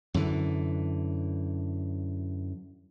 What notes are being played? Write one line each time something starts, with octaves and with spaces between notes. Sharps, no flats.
F#2 D3 E3